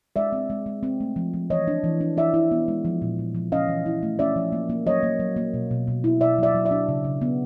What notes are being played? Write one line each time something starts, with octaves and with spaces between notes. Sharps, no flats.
G#3 D5 E5
C4
G#3
G#3
C4
A3
F3
F3
E3 C#5 D#5
D4
E3
D4
E4 D5 E5
E4
B3
G#3
F3
A#2
A#2
F3
C#4 D#5 F5
E3
E4
A3
C#4 D5 E5
F3
A#3
A#3
F#3 C#5 D#5
A#3
F#3
A#3
B2
B2
B2
E4
B2 D5 E5
F#3 D5 E5
F#3
D5 E5
D4
C#3
C#3
B3